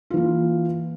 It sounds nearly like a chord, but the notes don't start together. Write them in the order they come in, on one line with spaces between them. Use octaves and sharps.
F4 E3 A#3